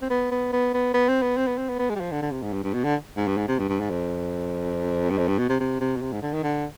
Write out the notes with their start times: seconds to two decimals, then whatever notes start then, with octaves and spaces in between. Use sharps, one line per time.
0.02 C4
0.10 B3
0.31 B3
0.53 B3
0.74 B3
0.94 B3
1.08 C4
1.22 B3
1.36 C4
1.47 B3
1.57 C4
1.69 B3
1.79 B3
1.90 G#3
1.96 G3
2.00 F3
2.11 D3
2.22 D3
2.31 C3
2.42 G#2
2.53 G2
2.64 G2
2.74 B2
2.84 D3
3.17 G#2
3.27 G2
3.37 G#2
3.48 C3
3.58 G2
3.69 G2
3.80 G#2
3.90 F2
5.10 G2
5.18 F2
5.28 G2
5.38 B2
5.49 C3
5.60 C3
5.80 C3
5.96 B2
6.01 C3
6.12 G#2
6.22 D3
6.33 D#3
6.43 D3